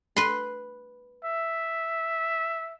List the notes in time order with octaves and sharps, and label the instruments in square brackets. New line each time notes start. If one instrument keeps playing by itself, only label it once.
[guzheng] B4 C6
[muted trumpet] E5